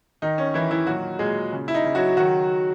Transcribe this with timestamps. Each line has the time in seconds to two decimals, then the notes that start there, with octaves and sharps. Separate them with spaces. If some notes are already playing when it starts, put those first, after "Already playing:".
0.22 D#3 D#4
0.38 C#4
0.54 D#3 E3 E4
0.71 E3 E4
0.87 A#2 F#3 F#4
1.19 A#2 G#3 G#4
1.53 C#3
1.68 E4
1.74 D#4
1.85 C#3
1.95 F#3 F#4
2.17 D#3 F#3 F#4